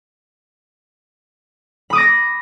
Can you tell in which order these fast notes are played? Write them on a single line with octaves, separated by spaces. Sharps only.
B5 D#6 D6 A#6